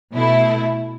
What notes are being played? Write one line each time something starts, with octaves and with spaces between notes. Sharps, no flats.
B2 A3 E4